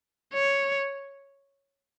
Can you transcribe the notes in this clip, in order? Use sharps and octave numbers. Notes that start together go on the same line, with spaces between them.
C#5